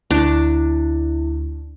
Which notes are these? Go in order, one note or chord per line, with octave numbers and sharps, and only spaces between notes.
D2 D4 E4